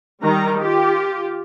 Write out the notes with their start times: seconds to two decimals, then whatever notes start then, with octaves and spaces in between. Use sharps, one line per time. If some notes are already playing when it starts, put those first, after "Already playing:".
0.23 D#3 G3 A#5
0.59 F4 G4